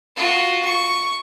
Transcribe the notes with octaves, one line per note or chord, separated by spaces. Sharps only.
F4 F#4
C#6